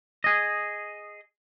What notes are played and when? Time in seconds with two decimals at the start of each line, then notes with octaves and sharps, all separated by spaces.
0.24 G#4 D#5